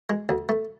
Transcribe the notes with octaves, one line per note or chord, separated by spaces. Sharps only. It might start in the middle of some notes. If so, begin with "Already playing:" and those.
G#3
D2
A3